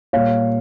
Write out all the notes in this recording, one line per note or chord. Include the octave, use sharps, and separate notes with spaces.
A#2 G3 A#3 C#5 F5